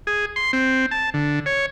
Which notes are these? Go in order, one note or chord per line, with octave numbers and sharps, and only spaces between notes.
G#4
C6
C4
A5
D3
C#5